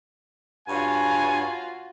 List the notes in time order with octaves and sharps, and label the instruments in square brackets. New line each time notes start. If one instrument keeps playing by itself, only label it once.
[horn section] G2 C#5 G#5 [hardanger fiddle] F4 F#4